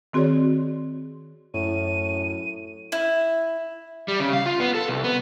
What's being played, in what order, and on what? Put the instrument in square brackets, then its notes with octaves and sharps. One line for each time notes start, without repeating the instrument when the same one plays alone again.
[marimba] D#3 C4 F#4 G#4 C#5 D5
[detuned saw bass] F#2 [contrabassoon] A2 [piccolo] D#7
[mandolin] E4
[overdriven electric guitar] G3
C#3
F5
F4
B3
A4
C2
B3